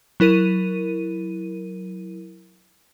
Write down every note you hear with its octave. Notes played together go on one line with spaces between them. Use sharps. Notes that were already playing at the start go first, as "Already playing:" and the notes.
F#3 E4 A#4 D#7